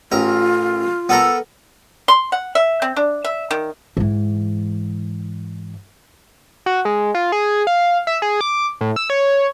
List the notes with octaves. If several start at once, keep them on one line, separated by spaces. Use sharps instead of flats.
A1 F4 A#4
B3 A4 A#4
C6
F#5
E5
C4
D4
E5
D#3
G#2 E3
F#4
G#3
F4
G#4
F5
E5
G#4
D6
A2
E6
C#5